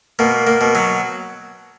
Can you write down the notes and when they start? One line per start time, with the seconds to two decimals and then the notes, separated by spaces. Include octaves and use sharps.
0.19 B2 A#3
0.47 A#3
0.61 B2
0.75 F#3